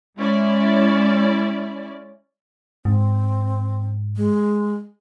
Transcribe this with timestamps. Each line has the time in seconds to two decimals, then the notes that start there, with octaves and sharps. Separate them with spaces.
0.17 G#3 C#4 E4 D5
2.85 G#2 C4
4.17 G#3